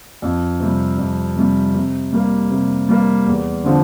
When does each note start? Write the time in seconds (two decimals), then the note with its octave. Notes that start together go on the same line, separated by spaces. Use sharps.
0.22 F2
0.60 C3 G3
0.98 F2
1.36 C3 G3
1.74 C3
2.12 G3 A#3
2.51 C3
2.89 G3 A#3
3.26 E2
3.64 D3 F3 C4